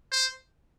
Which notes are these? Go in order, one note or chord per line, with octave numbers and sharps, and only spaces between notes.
C5